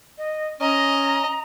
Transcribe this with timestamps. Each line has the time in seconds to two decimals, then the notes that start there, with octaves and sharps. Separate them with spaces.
0.18 D#5
0.61 C#4 D#5 A#5